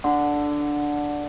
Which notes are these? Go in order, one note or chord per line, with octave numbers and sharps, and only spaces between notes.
D3